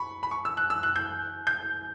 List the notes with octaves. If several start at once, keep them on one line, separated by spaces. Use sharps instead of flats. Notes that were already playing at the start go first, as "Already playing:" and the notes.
Already playing: B5 C#6
B5
C#6
E6
F#6
E6
F#6
G6
G6